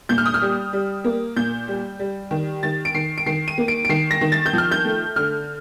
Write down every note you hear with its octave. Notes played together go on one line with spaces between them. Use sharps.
A#2 G6
F6
D#6
F6
G3
G3
A#3
A#2 G6
G3
G3
D#3
D#3 A6
D7
D#3 C7
D7
D#3 C7
D#7
A#3
D7
D7
D#3 C7
A#6
D#3
A6
G6
F3 F6
G6
A3
D3 F6